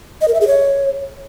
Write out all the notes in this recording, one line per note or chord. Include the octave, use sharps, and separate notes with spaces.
D#5
A#4
E5
G#4
C#5